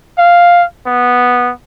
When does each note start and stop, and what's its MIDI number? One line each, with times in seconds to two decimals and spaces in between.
0.18 0.65 77
0.87 1.52 59